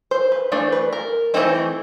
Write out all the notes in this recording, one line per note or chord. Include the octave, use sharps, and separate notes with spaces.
C5
B4
E3 A3 D4 C5
B4
A#4
E3 A3 C4 D#4